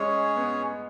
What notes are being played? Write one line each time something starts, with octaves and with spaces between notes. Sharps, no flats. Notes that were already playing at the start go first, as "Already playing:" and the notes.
Already playing: G#3 C#4 G#4 C#5
B3